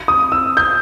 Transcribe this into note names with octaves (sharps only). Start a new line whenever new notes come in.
D#6
E6
G6